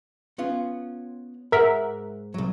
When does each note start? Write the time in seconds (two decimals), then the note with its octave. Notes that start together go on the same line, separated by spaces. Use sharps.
0.38 B3 C#4 F4
1.52 G#2 A#4 E5 F#5
2.34 C2 F#3